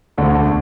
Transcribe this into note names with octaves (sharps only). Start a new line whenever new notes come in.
E1 D2 D3 A3 D4